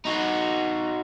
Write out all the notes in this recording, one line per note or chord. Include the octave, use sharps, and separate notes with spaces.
D#4 F#4